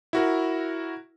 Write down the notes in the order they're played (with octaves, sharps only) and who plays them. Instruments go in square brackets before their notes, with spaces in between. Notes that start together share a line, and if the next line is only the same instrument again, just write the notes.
[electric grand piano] E4 F#4 A#4